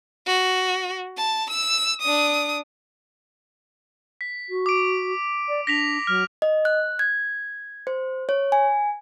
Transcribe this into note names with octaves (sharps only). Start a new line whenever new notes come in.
F#4
A5
E6
D4 D#6
B6
F#4
D6 D7
D5
D4 A#6 B6 F7
F#3 F6
D#5
F#6
G#6
C5
C#5
G#5